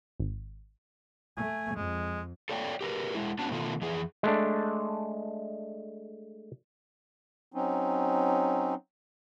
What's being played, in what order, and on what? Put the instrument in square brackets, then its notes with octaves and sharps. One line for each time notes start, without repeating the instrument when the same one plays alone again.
[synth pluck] G#1
[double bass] A3 [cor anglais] G#5
[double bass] F2 [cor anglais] G#3
[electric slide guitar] A4 C#5 D5 F#5 G5
G4 A#4 B4
G#3 E4
B3 C#4 D4 F#4 A5
B2 D#3 A3 B3 F4 A4
F2 E3 G#4
[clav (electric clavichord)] G#3 A3 D4
[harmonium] F#3 C4 C#4 D#4